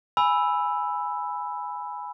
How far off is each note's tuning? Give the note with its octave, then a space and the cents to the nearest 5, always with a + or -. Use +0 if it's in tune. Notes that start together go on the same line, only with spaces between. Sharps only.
G#5 +0 B5 +0 E6 +0